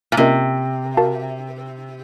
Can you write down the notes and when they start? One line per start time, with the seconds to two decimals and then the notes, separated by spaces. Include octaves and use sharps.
0.12 A#2
0.17 C3 A#3 C#4 F4 A#4 D#5
0.97 F#4 A#4 F5 A5